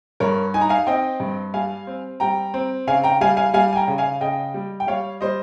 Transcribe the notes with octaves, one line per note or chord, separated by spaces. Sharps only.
G2 A#4 C#5
D#4 G#5
A#5
F5 G#5
C4 D#5 G5
G2
G3 F5 G#5
C4
G3 G5 A#5
C4
C#3 F5 G#5
G5 A#5
G3 F5 G#5
F5 G#5
G3 F5 G#5
G#5
G5 A#5
C#3
F5 G#5
C#3 D#5 G5
G3
G5
G3 C#5 F5
G3 C5 D#5